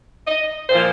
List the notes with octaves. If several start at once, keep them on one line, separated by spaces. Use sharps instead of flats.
D#5
A#2 F3 A#3 C5